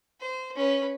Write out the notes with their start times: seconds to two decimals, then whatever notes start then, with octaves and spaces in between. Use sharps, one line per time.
0.20 C5
0.56 C#4 B4